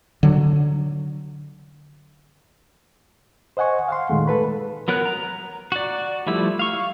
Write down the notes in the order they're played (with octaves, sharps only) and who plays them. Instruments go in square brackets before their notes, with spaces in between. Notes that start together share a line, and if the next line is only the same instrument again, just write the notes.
[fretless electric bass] D3 F#3
[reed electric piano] C5 D#5 F#5 G#5 C#6
F5 F#5 C6
A#2 D#3 G#3 A3
A4 B4 B5
[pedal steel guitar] F#3 B3 A#4 C#5 F#6
A#5
F#4 D5
F3 G3 A3 E4
F5 C#6